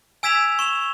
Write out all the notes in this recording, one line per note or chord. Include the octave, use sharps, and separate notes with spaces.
G#5 E6 G#6 B6 E7 F7
C#6 E7 F7 G7